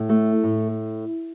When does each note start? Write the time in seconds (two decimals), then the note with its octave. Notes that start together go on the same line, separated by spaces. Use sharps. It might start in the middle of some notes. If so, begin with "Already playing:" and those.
Already playing: A2
0.09 A3
0.44 A2